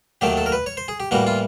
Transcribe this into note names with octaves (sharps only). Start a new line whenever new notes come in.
D#2 D#3 F#3 A3 G4
A4
A#4
B4
C#5
C5
G#4
G4
A2 E3 G3 A#3 F#4
F4